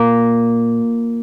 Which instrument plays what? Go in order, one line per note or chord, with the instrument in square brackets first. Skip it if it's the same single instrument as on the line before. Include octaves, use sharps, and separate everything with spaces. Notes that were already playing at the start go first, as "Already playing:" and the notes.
Already playing: [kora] A#2 A#3